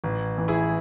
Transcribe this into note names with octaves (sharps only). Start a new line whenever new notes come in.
A1
E3
E4 G#4